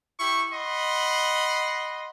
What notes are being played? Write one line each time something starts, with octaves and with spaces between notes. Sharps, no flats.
E4 G4 C#6
D#5 F#5 B5 C6